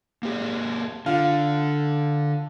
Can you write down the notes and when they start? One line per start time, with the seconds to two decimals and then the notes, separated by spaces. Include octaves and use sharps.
0.23 A#3 G4 G#4
1.06 D3 F4